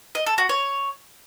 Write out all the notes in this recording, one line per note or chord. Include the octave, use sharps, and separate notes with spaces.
D#5
A4
F#4
C#5